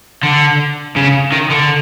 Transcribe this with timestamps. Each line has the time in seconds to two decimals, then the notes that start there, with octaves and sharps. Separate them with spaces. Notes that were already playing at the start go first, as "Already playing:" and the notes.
0.23 D3
0.96 C#3
1.32 D#3
1.50 D3